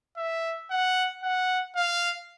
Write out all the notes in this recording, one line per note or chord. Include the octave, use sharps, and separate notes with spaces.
E5
F#5
F#5
F5